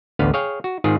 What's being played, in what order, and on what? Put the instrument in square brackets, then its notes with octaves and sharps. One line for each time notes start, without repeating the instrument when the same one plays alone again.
[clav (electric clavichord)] A1 D2 D3 B3 B4 F5
G#4 C#5 F5 G5
F#4
G#2 D#3 C4 F4 G#4